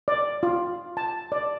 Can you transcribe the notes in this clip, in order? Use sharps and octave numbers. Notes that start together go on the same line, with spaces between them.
D5
F4
A5
D5